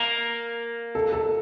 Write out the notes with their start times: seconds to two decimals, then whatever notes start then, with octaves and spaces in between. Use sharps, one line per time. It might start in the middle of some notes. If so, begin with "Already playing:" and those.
Already playing: A#3
0.95 A4
1.12 A4